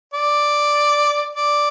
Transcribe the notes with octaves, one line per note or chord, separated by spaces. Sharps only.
D5
D5